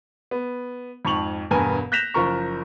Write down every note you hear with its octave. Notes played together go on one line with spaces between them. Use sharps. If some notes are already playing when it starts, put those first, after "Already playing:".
B3
F2 G#2 A5 C#6 F7 F#7
E1 G2 B3 A#4 G#5
F#6 G6 A#6 B6 E7 F7
F#1 F3 A#4 C#6